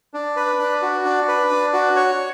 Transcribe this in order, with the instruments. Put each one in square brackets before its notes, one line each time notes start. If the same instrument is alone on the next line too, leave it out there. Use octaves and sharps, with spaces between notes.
[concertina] D4
B4
D4
F#4
D4
B4
D4
F#4
C#5